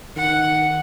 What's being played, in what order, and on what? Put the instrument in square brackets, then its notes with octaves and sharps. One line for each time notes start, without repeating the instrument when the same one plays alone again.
[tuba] D#3 [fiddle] F#5